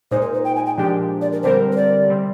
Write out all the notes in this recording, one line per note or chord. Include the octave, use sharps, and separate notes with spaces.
A#2 G#3 D#4 C5
A#4
C5
G5
G#5
G5
A#2 F3 G#3 D4 G4 G5
D5
A#4
D3 G3 C4 G4 A#4 C5
C5
D5
C3 G3 C4